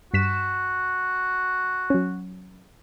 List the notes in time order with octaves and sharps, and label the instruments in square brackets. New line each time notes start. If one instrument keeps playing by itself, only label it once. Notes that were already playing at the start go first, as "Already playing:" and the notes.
[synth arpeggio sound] G2 B6 E7 [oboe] F#4
[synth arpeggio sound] F#3 C#4